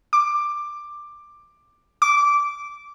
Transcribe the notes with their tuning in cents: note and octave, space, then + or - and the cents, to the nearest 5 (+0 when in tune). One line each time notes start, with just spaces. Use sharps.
D6 +10
D6 -15